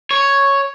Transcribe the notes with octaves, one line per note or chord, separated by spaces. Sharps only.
C#5